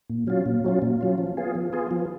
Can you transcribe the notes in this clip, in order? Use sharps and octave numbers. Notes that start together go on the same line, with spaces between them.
A#2
F#3 C#4 F4
A#2
F#3 C#4 F4
A#2
F#3 C#4 F4
F3
B3 F4 G#4
F3
B3 F4 G#4
F3